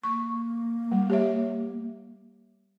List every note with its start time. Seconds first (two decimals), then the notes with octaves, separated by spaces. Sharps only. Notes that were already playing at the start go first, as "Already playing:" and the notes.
0.03 A#3 C#6
0.92 G3
1.10 G4 C#5 E5